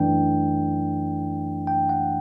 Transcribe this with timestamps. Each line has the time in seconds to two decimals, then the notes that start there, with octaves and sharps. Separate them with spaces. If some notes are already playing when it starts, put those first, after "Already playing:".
Already playing: F#2 E3 A3 D4 G5
1.67 G5
1.89 F#5